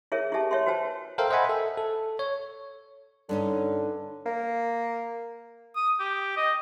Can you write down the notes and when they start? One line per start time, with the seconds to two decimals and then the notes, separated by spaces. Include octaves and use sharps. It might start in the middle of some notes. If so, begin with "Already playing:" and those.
0.12 E4 G#4 A#4 C#5 E5
0.32 E4 G4 A4 E5 A5
0.51 C#5 E5 G5 C6
0.66 F#4 B4 C5 G5 A5
1.18 A4 A#4 C5 E5 F5 G5
1.30 C5 D#5 E5 F#5 G#5 B5
1.49 A4 E5
1.78 A4
2.19 C#5
3.29 G2 D3 C#4 D#4
4.26 A#3
5.76 D#6
6.00 G4
6.37 D#5